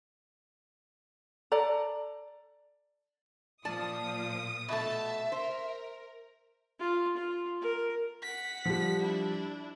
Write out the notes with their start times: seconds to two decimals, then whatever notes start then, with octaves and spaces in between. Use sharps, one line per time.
1.52 A4 D5 A#5
3.65 A#2 F3 D5 A5 D#6
4.69 B2 A3 E5 A5
5.32 A#4 C5
6.80 F4
7.17 F4
7.62 A#4
8.23 F#5 B6
8.66 F3 G3
9.01 D4 E4